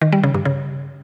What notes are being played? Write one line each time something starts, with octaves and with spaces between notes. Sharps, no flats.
D#3
G3
C#3
G2
C#3